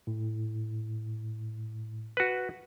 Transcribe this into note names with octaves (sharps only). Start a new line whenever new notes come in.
A2
F#4 B4